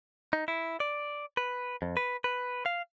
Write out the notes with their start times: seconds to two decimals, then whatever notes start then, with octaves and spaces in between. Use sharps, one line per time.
0.33 D#4
0.48 E4
0.80 D5
1.37 B4
1.82 F2
1.97 B4
2.24 B4
2.66 F5